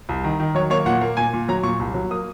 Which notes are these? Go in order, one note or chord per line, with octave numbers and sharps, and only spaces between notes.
C2
D#3
D#3
F#3 C#5
A#3 C#5
A#2 F#5
A#3
A#2 G#5
A#2
F#3 A#5
A#2 C#6
C2
F#3
A#3 D#6